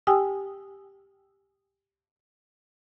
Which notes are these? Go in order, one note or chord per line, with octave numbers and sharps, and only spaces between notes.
G4 G5 G#5 D#6 E6